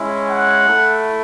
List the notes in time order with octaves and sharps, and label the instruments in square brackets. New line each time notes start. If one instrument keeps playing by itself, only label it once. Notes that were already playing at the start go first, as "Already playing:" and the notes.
Already playing: [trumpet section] G#3 C#4 E4
F#5
A3 E4